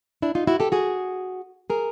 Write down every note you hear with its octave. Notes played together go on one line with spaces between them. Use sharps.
D4 E4
D#4 F4
E4 F#4
G4 A4
F#4 G#4
G#4 A#4